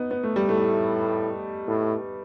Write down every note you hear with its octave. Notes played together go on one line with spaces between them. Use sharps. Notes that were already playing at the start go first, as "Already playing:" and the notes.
Already playing: B3 D#4
B3
A3
G3
A2 A3
A2